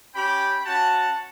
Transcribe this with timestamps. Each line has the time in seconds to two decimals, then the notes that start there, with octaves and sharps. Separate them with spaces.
0.14 C#4 G4 G5 B5
0.66 C#4 F#4 F#5 A5